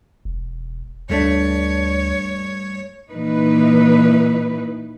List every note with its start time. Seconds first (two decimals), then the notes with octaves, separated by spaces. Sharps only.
0.25 E1
1.09 D2 G2 A3 D4 C#5
3.11 A#2 E3 D#4 B4